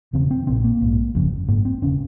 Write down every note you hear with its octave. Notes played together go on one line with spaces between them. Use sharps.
E1 E2 C#3 C4
C4
A#1 A#2 C4
A#3
A#1 G#2
G1 F2 C#3
G#1 G#2 A#3
C4
E1 C#3 C#4